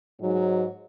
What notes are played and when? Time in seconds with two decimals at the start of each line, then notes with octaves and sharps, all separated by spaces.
0.21 G#2 F#3